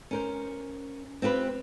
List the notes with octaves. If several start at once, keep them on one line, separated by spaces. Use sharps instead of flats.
C#4 A#4 C5
C4 F4 G4 B4